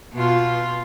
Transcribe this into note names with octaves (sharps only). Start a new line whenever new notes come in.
B2 F4